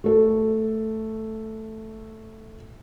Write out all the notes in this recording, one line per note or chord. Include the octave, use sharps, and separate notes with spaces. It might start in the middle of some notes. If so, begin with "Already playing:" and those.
A3 A4